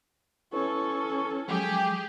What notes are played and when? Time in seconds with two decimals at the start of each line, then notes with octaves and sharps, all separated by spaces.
0.53 C#4 E4 A4 B4 C#5 C#6
1.48 F3 F#3 G#3 G4 G#4 G5